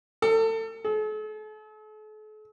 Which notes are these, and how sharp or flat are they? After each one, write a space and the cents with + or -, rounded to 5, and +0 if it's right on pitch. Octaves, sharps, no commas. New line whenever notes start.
A4 +30
A4 -45